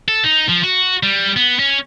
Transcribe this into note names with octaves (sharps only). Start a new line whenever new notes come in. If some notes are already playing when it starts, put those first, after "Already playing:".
A4
D#4
F3
F#4
G3
B3
C#4